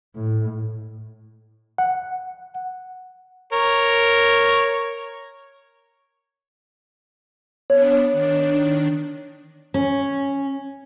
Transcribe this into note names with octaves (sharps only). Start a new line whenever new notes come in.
A2
F#5
A#4 C#5
B3 D4 C#5
D#3 D4
C#4